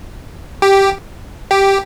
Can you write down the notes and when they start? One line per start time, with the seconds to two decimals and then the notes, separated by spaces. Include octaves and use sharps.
0.62 G4
1.51 G4